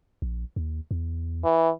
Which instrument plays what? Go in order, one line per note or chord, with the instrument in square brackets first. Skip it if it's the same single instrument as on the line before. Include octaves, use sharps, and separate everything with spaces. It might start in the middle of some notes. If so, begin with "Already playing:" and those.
[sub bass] A#1
D#2
E2
[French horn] E3